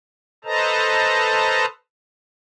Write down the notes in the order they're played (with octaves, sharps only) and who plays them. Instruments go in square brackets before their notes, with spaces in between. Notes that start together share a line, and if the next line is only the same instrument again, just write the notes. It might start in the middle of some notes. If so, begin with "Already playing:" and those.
[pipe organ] A4 B4 C5 D#5 A5 A#5